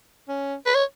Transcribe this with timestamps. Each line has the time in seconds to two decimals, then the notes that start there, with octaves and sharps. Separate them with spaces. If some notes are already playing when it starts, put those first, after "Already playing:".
0.29 C#4
0.66 B4
0.75 C#5